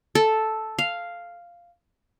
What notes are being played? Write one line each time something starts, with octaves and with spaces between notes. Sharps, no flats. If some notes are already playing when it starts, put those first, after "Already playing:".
A4
F5